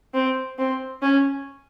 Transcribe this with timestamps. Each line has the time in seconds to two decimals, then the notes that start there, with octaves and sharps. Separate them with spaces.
0.14 C4
0.58 C4
1.02 C#4